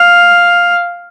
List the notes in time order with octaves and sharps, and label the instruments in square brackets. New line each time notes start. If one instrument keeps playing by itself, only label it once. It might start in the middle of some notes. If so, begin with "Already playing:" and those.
Already playing: [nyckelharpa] F5